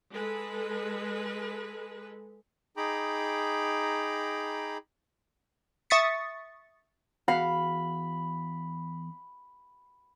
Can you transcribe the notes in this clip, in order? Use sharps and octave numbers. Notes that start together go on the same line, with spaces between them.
G#3 A4 B4
D#4 G#4 G5 A#5 B5 D6
E5 C#6 D#6 A6 B6 C#7
E2 F#4 F5 F#5 B5